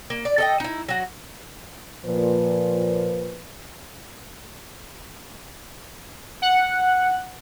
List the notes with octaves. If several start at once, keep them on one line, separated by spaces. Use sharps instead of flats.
A#3
D5
A4 D#5 G5
D#4 E4
F#3 F#4
A#2 F3 B4
F#5